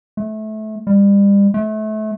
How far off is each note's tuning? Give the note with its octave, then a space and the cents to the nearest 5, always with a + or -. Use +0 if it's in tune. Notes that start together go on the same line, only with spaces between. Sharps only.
A3 -25
G3 +35
A3 -30